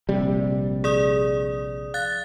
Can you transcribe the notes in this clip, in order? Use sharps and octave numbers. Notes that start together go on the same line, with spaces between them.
A#1 C3 G3
G#4 D5 D#6
F5 F#6 A6